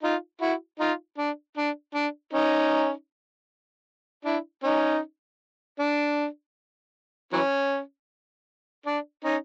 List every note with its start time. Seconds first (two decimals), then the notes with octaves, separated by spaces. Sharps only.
0.03 D#4 F4
0.41 E4 F#4
0.79 D#4 F4
1.18 D4
1.57 D4
1.95 D4
2.33 C#4 D#4
4.25 D4 E4
4.63 C#4 D#4
5.79 D4
7.33 E3 F#3 C#4
8.86 D4
9.24 C#4 D#4